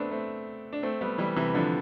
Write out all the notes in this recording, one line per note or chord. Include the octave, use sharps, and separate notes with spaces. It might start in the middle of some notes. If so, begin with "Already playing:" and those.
Already playing: A3 B3 C4 D4
A3 C4
D4
A3 C4
G3 B3
E3 G3
C3 E3
D3 F3